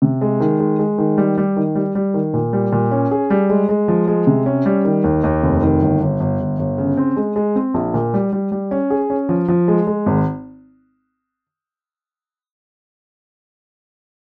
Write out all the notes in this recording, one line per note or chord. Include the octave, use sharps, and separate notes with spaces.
C3
G#3
D#3
G#3
G#3
D#3
G3
G3
D#3
G3
G3
D#3
A#2
G3
A#2
C#4
G#4
G3
G#3
G#3
F3
G#3
C3
C#4
G3
D#3
D#2
D#2
F1
D#3
G1
G1
G1
G1
G1
C#3
C4
G#3
G#3
C4
A#1
A#2
G3
G3
G3
C#4
G#4
C#4
F3
F3
G#3
G#3
G#1